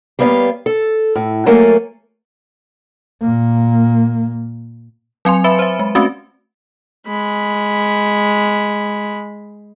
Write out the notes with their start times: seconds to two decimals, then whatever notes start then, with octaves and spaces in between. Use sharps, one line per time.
0.19 G3 A#3 B3 C#5 D#5 F5
0.66 A4
1.15 A2
1.46 F#3 A3 A#3 A4 A#4 G#5
3.21 A#2 A#3
5.25 F#3 C4 G#5 C6
5.44 B4 E5 B5 C#7
5.59 C5 E5
5.79 G#3
5.95 A3 C4 C#4 F#4
7.07 G#3 B5